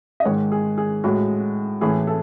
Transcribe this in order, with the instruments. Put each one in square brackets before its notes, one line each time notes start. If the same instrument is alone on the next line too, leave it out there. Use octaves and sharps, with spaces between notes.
[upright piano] D#5
G#2 D#3 G#3 C#5
G#4
G#4
A2 G#3 F#4
A2 E3 A3 G#4
A4